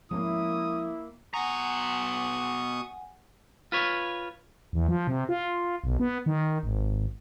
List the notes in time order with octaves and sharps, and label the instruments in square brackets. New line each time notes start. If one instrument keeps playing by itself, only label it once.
[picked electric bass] F3 G#3 C#4 [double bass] A#3 [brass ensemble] E4 [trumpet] D#6
[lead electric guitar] B2 A#5 [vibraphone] F#5 G#5 [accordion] C#6 D#6
[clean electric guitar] F4 B4 C#5
[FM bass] E2
F3
C3
F4
B1
B3
D#3
G#1